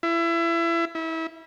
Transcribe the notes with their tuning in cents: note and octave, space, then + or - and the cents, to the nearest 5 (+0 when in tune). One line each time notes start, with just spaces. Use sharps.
E4 +30
E4 -25